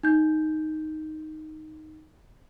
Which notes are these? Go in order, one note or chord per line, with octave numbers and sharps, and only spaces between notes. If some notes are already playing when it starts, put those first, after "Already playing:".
D#4 G6